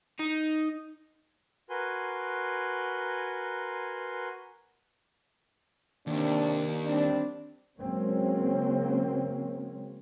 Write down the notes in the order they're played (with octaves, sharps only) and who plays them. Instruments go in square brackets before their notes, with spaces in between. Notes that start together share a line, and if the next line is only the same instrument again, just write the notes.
[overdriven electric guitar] D#4
[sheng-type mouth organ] F#4 A#4 B4 G#5 C6
[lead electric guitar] D#2 [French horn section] C3 D#3 D4
[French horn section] G3 C4 D4
[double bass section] C#3 F#3 G#3 A#3 C4 C#4